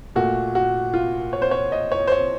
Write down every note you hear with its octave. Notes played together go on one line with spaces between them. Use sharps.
A#2 A3 F#4
F#4
F4
C#5
C5
C#5
D#5
C#5
C5
C#5